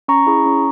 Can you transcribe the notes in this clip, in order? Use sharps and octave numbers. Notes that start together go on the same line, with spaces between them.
C#4 A#5 C#6
E4 G#4
C#4